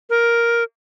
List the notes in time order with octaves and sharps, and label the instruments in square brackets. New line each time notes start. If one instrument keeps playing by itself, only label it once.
[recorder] A#4